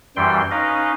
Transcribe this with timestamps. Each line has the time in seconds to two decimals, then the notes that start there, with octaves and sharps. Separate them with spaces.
0.16 F#2 E3 G3 G5 C6
0.51 C#4 D#4 B4 D#5 F5